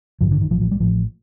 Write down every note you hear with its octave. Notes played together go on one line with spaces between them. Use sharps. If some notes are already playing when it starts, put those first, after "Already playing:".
A1 G2 D3 F3
D3
D#3
A#1 A2 F3
F3
G3
A1 A2 F3